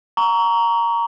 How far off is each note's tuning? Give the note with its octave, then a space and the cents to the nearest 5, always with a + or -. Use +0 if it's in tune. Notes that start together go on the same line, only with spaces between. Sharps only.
A#5 +0 C#6 +30